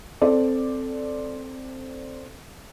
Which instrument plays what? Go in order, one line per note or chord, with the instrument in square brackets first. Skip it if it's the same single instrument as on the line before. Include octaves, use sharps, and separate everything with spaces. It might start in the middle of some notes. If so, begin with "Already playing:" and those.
[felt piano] C4 A4 D5